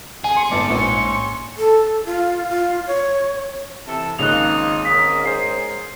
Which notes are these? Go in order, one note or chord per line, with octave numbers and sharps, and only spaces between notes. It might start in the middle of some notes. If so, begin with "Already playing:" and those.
G#4 G#5
C6 C#7
G1 G#2 D5 A5 D6
A#1 C#4 C6 C#6
A4
F4
F4
C#5
C3 E3 A4
G#1 C#3 A#3 D#4 F4 F#6 F7
G#2 C#4 A#4 D#6 B6
G#4 C5 C7